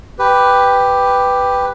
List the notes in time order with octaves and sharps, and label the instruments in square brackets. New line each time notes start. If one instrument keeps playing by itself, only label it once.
[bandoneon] G4 B4